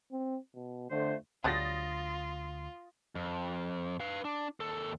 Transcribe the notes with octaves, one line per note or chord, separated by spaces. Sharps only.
C4
B2
F2 D3 A3 C5
D2 F#3 G3 D4 F4 D#6 A6 A#6
F2
B4 F5
D4
D#2 A4